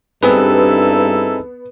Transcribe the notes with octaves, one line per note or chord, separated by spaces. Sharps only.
G2 B3 C4 D#4 E4 G#4 A4 B4